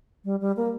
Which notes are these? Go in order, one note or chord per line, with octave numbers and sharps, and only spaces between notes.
G3
G3
A#3